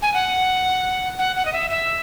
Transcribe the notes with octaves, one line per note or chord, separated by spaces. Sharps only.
G#5
F#5
F#5
F#5
D#5
E5
E5